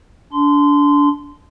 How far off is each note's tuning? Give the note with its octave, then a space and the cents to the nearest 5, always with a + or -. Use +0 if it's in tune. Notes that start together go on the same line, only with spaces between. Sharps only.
D4 -25 C6 -20